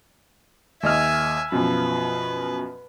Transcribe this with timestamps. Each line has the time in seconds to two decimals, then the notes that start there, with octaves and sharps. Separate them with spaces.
0.83 D#2 D#5 E5 G#5 F6
1.52 F#2 B2 F3 B4